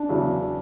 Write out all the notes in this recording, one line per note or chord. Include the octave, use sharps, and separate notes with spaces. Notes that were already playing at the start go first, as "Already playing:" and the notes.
Already playing: D4
E2 C#3 F#3